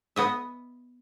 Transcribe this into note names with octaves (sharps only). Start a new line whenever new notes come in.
B3 D#5 E5